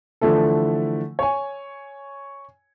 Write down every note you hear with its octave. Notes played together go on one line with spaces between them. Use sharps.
D3 E3 F3 A3 E4 A4
C#5 G#5